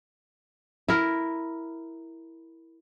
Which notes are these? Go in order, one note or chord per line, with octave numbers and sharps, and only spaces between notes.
E4 A#4